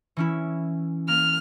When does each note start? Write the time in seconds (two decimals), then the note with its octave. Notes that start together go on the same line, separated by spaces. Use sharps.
0.17 E3 C#4 E4
1.08 A#3 F6